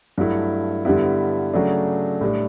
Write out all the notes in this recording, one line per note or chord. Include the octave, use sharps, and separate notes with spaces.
G2 F#3 A3 E4
G2 D3 G3 B3 E4
C#3 F#3 A3 D4
A2 G3 D4